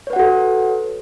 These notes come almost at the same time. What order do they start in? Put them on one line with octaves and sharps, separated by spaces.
C#5 B4 F#5 F#4 A4